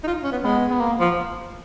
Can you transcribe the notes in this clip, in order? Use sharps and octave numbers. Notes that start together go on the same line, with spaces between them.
D#4
F4
C#4
B3
G#3 B3
B3
A#3
F3